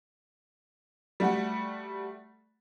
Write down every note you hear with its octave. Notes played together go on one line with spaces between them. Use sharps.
G3 A3 F#4